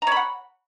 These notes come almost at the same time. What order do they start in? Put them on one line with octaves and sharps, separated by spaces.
A#5 C#5 B5 F#5